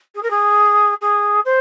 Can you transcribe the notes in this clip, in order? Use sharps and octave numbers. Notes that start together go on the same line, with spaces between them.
G#4
A#4
G#4
G#4
C5